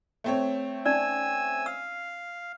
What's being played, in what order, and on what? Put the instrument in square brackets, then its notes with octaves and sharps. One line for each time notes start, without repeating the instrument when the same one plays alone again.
[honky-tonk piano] A3 C4 C#5
[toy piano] C#4 D#4 D5 [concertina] G#5 E6
[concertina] F5 [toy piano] E6